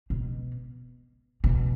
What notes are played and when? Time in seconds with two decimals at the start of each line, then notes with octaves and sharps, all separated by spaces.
0.10 B2
1.44 B2